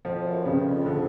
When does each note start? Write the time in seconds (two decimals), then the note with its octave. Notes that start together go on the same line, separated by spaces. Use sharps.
0.05 F2 F3
0.25 F#2
0.45 G2 C#3
0.66 F2
0.86 D3